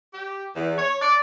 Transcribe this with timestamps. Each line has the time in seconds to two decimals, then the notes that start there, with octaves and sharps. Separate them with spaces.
0.14 G4
0.55 E2
0.78 C#5
1.02 D5